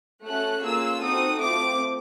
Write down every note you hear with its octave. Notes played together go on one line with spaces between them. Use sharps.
A3 C#4 F#4 A4 F#6
A#3 C#4 F4 G#4 E6
C4 D#4 F#4 A4 D#6
A3 C4 F4 D6